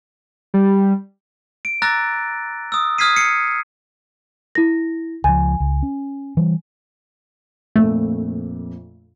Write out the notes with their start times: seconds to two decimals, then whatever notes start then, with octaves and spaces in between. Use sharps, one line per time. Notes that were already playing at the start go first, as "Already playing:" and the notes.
0.54 G3
1.65 D7
1.82 A#5 D6 E6 F#6 A6 A#6
2.72 D#6 E6
2.98 D#6 F6 G#6 B6 C7 D#7
3.16 C7 C#7 D#7
4.55 E4 A#6
5.24 C#2 F3 G#5
5.60 C#2
5.83 C#4
6.37 E3 G3
7.76 A#1 F2 A#2 A3